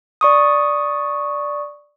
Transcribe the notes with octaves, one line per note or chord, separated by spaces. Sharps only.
D5 C#6 D#6